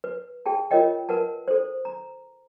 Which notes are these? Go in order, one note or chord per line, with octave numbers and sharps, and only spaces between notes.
B4
G#4 G5 A5
F4 A#4 C#5 D#5 G5
A#4 B4 F#5 A5
A4 C5
A#5